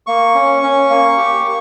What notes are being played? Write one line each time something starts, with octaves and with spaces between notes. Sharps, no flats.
A#3 C#6
C#4
C#4
A#3
G4
A#3